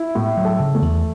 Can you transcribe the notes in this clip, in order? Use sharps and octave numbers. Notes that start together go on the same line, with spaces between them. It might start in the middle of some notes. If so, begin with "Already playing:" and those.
Already playing: E4
A2 B3
F#3
A4
C#3
A3
E2